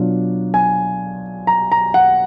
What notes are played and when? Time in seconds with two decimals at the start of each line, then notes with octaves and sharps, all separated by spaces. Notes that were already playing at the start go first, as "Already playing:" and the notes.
Already playing: B2 F#3 D4 F4
0.54 G#5
1.47 A#5
1.72 A#5
1.94 F#5